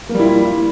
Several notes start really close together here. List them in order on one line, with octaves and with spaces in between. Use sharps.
A#3 G3 E4 F4